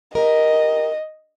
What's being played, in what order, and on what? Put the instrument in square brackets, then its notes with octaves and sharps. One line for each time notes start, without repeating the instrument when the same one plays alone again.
[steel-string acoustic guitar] G4 A#4 [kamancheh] D#5